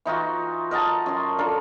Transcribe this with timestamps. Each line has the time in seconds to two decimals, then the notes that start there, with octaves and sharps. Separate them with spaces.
0.05 E3 D#4 F4 F#4
0.71 A#4 D#5 F#5 A5
1.06 F#2 C6
1.38 D4 F4 A4 A#4